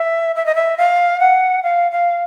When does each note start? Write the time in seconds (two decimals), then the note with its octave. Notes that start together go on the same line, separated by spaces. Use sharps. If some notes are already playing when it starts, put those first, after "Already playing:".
Already playing: E5
0.36 E5
0.46 D#5
0.55 E5
0.78 F5
1.20 F#5
1.63 F5
1.91 F5